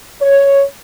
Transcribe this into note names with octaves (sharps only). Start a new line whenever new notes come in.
C#5